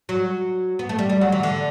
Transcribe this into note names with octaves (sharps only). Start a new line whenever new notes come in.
F#3
B3
A3
G3
G3
F#3
E3
D3